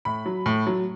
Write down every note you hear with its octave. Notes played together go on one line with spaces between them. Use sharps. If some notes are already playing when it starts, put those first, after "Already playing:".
A2 B5
F#3
A2
F#3